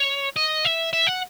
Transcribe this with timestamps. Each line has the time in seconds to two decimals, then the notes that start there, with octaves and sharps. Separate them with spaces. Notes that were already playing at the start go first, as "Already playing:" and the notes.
Already playing: C#5
0.36 D#5
0.65 E5
0.93 E5
1.07 F#5